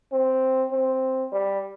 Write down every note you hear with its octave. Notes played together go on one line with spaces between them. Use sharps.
C4
C4
G3